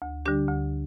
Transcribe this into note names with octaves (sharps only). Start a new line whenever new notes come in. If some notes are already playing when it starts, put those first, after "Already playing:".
D2
D3 G3 D4 G4
D2